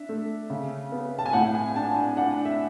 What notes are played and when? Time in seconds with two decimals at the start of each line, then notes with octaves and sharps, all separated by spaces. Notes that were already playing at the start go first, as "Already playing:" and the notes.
Already playing: D4 E5
0.09 A3
0.50 C#3
0.92 B3
1.19 A5
1.26 G#5
1.33 A2 F#5
1.55 G#5
1.76 D4 A5
1.96 G#5
2.17 D4 F#5
2.45 E5